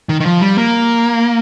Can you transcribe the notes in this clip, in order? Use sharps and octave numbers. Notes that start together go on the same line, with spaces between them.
D#3
D#3
F3
G3
A#3